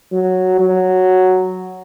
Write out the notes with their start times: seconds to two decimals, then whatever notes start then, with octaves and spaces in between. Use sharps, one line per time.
0.12 F#3
0.60 F#3